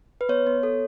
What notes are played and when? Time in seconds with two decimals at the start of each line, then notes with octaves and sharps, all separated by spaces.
0.21 B4
0.29 B3 C#5
0.47 B3
0.63 A4